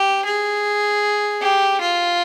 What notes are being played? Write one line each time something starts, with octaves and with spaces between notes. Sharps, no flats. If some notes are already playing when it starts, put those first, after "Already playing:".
Already playing: G4
G#4
G4
F4